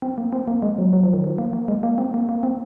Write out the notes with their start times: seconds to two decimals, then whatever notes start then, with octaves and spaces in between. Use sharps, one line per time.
0.02 C4
0.18 A#3
0.33 C4
0.48 A#3
0.62 G#3
0.78 F#3
0.93 F#3
1.03 F3
1.13 D#3
1.24 F3
1.38 A#3
1.53 A#3
1.68 G#3
1.83 A#3
1.98 C4
2.14 A#3
2.29 A#3
2.43 C4